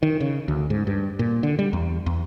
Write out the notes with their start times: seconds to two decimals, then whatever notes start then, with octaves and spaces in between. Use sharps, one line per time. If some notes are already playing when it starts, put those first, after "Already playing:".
0.03 D#3
0.20 C#3
0.48 D2
0.70 G#2
0.87 G2
1.19 A#2
1.43 D3
1.59 G3
1.73 E2
2.06 E2